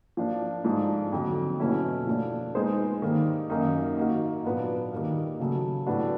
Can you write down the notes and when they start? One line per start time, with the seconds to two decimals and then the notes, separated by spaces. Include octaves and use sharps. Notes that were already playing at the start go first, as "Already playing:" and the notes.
0.17 F3 A#3 D4
0.64 G#2 F3 A3 D4
1.12 F2 D3 F#3
1.60 B2 F#3 A3 C#4 E4
2.07 F3 A3 D4
2.55 G#3 B3 D#4 G#4 C5
3.02 D#3 G3 A#3
3.50 F#2 D#3 F#3 A#3 D#4
3.97 A#3 D#4 F#4
4.44 A#2 F#3 B3 D4 F4
4.92 D#3 G3 A#3
5.39 C#3 F#3 A3
5.87 A2 F#3 B3 D4 F#4